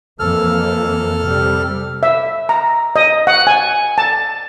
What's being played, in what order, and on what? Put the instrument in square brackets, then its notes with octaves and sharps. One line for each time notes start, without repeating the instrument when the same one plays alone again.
[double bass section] F2 E3 A#3 [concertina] A4 F6
[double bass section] C3 G3
[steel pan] E5
A#5
D#5
F#5
G#5
A5